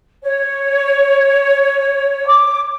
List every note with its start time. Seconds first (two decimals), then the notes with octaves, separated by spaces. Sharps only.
0.23 C#5
2.27 D6